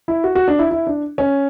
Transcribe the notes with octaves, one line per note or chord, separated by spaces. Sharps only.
E4
F#4
F#4
D4
E4
E4
D4
C#4